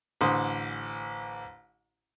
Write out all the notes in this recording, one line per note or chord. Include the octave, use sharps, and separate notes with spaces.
A1 D3 C5 C6 D#6